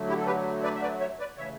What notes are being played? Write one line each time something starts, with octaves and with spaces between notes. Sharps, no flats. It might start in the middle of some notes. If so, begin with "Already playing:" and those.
Already playing: D3 F#3 A3
E4 G4
A4
G4 B4
B4 D5
E5
B4 D5
C#5 E5
B4 D5
C#3 E3 A3 C#5 E5